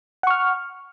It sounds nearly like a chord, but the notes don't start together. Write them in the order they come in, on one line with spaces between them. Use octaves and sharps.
F#5 C#6 F6